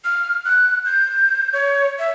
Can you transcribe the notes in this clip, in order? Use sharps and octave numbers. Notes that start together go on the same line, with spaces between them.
F6
F#6
G6
C#5
E5